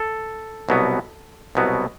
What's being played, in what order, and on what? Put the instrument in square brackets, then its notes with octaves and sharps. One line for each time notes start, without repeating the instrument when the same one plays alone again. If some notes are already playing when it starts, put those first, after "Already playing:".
Already playing: [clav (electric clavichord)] A4
C2 B2 F#3 B3
C2 B2 F#3 B3